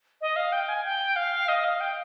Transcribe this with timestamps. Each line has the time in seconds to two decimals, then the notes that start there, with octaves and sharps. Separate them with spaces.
0.21 D#5
0.36 F5
0.52 G5
0.68 G#5
0.85 G5
1.16 F5
1.48 D#5
1.64 F5
1.81 G5